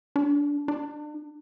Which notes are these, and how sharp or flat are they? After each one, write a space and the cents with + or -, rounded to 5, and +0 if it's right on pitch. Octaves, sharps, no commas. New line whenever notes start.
D4 -20
D4 +35